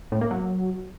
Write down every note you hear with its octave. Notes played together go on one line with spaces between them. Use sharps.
A2
A#3
F#3